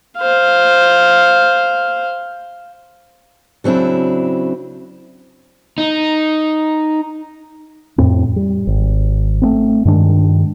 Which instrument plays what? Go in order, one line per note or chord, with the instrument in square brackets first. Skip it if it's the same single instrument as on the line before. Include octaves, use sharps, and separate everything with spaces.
[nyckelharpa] C5 F5
[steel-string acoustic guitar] C#3 F#3 C4 D4 E4
[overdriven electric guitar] D#4
[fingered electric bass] F2 A2 C4
G3
G#1
A3 B3 C4
G2 D#3 G#3 D4